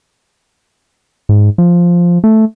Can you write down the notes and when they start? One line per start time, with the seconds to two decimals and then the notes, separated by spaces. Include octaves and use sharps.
1.29 G#2
1.58 F3
2.24 A3